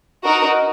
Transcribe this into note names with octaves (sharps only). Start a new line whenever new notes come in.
D#4 F#4 A#4